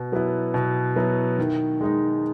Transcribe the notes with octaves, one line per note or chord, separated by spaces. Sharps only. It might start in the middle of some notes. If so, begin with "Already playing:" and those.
Already playing: B2
F#3 B3 E4
B2
F#3 B3 E4
D#3
G#3 D#4